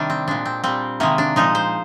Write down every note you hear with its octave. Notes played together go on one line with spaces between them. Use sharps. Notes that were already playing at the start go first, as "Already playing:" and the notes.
Already playing: C3 D#3 G3 D4
C4
A#2 G#3 D4
C4
A#2 G3 C4
C3 D#3 G#3 A#3
D4
A#2 F3 G#3 D#4
C5